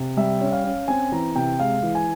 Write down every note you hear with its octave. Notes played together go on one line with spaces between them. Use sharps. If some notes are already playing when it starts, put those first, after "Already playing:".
Already playing: C3
G3 E5
C#4
F5
C#4
C4 G#5
E3 A#5
C3 G5
G#3 F5
E3
G#5